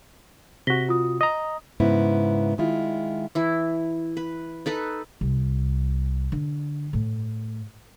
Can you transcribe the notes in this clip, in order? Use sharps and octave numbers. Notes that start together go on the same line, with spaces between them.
C3 F#4 A#6 B6 G7
F4 D#6
D#5 A#5 D#6
G#2 C#3 B3 E4
D#3 G#3 E4 F4
E3 E4
B4
D#4 A4 B4
C2
D3
A2